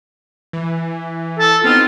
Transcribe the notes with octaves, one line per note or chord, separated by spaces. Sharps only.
E3
A4
B3 C4 D#4 F4